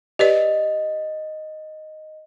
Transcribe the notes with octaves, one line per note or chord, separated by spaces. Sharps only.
G4 B4 D5 D#5